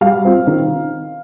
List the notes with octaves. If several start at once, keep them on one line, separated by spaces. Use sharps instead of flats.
G3 F5
C4 F4
D#3